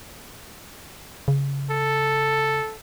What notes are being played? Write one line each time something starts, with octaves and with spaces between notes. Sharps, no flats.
C#3
A4